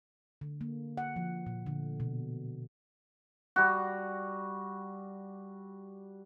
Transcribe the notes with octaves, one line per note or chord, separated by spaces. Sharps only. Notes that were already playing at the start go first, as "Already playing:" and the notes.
D3
A#3
F#5
F3
A#2
D3
B2
G3 F#4